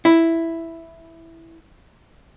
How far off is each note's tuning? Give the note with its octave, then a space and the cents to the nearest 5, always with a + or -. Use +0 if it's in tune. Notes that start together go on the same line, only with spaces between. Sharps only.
E4 +0